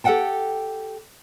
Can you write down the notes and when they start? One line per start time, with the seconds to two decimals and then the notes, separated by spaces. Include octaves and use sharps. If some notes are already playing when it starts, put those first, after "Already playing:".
0.04 G4 A4 A#4 F#5 G5 A5